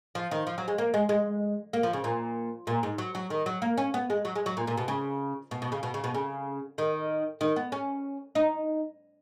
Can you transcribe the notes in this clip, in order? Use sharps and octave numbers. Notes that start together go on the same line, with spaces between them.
F3
D#3
F3
F#3
G#3
A#3
G#3
G#3
A#3
F3
C#3
A#2
A#2
G#2
F#3
F#3
D#3
F#3
A#3
C#4
B3
G#3
F#3
G#3
F#3
A#2
A#2
B2
C#3
B2
B2
C#3
B2
C#3
B2
C#3
D#3
D#3
B3
C#4
D#4